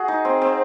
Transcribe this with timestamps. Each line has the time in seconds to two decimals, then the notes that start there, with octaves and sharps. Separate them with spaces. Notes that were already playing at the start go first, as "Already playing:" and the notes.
Already playing: F#4 G#4
0.08 D#4
0.25 C4
0.42 C4